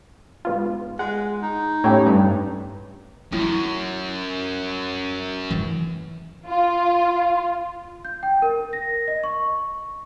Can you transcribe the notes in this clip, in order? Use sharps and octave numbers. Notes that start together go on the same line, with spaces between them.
G#2 B3 F4
G#3 F#5
D#4
A2 C#4 G4 C#5
G2
F#2 E4
E3
F4
G6
G5
A#4
A#6
D#5
C#6